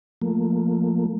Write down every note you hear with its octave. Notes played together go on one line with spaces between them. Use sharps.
F3 A3 A#3